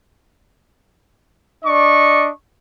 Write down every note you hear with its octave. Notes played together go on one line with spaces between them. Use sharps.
D4 D5 D#5 C#6